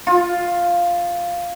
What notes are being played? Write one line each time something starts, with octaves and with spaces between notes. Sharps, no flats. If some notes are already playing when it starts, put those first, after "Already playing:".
F4